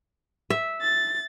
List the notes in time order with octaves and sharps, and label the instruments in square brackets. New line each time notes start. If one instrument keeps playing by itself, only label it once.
[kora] E5
[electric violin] A6